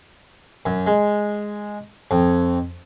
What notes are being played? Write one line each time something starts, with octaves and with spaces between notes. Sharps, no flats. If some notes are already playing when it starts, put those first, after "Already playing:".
F#2
G#3
F2